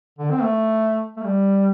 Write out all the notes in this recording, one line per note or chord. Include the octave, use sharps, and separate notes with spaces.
D3
C4
A3
A3
G3